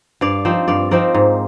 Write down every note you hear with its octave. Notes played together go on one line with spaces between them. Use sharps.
G2 D5 F5
F3 C4 D#4
G2 D5 F5
F3 C4 D#4 A#4 D5
G#2